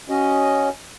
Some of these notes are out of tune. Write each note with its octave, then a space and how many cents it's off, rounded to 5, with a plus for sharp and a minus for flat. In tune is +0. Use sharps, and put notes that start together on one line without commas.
C#4 +0 F#4 +25 D#5 +0